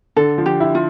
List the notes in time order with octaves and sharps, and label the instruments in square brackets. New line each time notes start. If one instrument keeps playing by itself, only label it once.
[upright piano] D3 [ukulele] A4
[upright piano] F3
[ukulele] G4
[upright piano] E4
[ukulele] F4